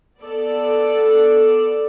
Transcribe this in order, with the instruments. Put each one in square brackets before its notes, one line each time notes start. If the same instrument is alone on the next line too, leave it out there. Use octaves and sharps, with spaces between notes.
[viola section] B3 A4 D5